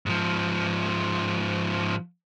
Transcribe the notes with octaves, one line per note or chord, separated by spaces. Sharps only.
G#2 F3